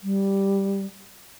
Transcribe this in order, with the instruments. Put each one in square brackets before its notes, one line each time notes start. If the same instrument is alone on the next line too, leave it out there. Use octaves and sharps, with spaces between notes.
[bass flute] G3